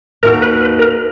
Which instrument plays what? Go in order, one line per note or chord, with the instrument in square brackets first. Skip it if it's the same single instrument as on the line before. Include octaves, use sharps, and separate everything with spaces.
[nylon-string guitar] D#2 D#3 A#3 D#4 F#4 [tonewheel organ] A#4
[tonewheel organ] B4
B4
A#4